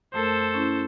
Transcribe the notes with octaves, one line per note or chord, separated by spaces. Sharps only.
F#2 A3 A4 A#4 C5
C#4 E4